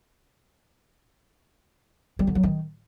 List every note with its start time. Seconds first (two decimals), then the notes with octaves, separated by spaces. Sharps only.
2.19 G3
2.27 D3
2.35 F#3
2.43 D#3